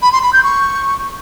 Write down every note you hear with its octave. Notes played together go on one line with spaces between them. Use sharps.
B5
C6
B5
G6
C#6